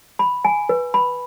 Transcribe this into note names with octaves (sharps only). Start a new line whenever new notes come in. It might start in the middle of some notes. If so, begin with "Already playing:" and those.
B5
G#5
B4
B5